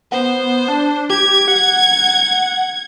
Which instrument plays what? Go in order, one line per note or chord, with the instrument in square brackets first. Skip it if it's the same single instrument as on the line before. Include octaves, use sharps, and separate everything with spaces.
[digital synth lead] B3 [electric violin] C5
[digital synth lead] D4
[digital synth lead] G4 [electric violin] G#6
[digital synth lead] F#5